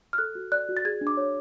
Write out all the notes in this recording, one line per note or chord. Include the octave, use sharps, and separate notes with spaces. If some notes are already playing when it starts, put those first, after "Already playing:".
F6
A4 F#6
F#4
D5 F#6
F#4
A6
G#4 G#6
D4
D6
C#5